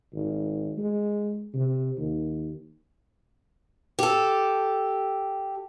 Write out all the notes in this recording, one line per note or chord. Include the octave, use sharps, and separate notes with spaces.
G#1
G#3
C3
D#2
G4 A4